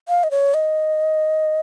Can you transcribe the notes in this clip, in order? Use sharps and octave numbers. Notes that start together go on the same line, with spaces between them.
F5
D#5
C#5
D#5